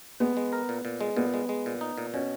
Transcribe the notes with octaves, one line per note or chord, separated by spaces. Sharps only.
G#3 B3
G#3
A#4
A#2
A#2
G#3
A#2 B3
G#3
G#3
A#2
D#4
A#2
B2 C#4